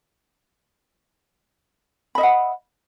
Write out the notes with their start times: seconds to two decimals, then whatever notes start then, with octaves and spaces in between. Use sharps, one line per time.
2.15 B5
2.18 D#5
2.20 E5
2.23 F#5